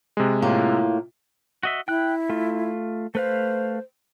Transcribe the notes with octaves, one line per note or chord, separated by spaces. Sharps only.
C3 G#3
A2 A#3 F4
F#4 D#5 E5
E4 G5 F#6
A3 F4
A3 B4 C5 F5